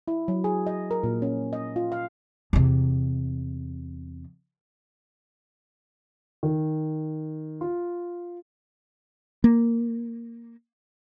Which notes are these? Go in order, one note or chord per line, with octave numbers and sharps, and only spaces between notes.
E4
F#3
G#4
D#5
A#4
A#2
C#4
D#5
F4
F5
E2 C3
D#3
F4
A#3